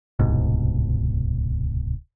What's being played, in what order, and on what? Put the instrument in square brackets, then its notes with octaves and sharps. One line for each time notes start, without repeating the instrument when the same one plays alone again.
[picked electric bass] D1 C2 G#2 B2